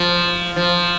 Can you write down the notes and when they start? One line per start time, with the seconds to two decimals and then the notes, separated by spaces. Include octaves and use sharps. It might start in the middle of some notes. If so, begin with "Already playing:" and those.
Already playing: F3
0.56 F3